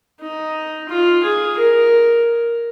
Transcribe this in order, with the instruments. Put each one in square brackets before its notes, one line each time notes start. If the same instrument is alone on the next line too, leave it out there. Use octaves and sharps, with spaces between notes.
[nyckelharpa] D#4
F4
G#4
A#4